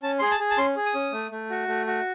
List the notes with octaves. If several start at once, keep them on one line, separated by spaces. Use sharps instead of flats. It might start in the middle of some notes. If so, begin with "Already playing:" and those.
C#4 A5
G#4 C6
A5
G#4
A5
C#4 C6
G#4
D#6
C#4
A3
A3
F#4
A3
F#4